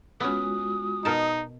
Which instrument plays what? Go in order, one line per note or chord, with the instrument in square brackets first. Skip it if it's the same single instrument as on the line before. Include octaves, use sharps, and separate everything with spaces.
[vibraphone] G#3 F4 F#4 [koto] B3 C#4 [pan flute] D#6
[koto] B2 A#4 A5 [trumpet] D#4